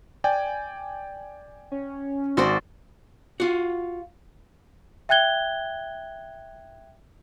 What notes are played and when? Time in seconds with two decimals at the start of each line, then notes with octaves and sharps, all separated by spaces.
0.24 D5 G5 G#5
1.71 C#4
2.37 G#1 F#4 C5 D5
3.40 F4 F#4
5.09 E5 G5 F#6 G#6 G7